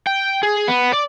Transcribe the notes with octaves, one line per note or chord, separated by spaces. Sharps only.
G5
G#4
B3
D5